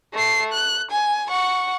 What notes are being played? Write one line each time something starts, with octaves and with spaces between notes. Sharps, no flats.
A3 C7
F#6
G#5
F#5 C#6